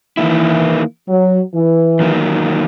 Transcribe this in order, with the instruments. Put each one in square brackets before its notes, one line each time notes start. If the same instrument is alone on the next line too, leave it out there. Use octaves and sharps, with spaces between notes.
[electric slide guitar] D#3 A#3 E4 [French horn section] E3
[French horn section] F#3
E3
[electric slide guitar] E2 D#3 F#3 A#3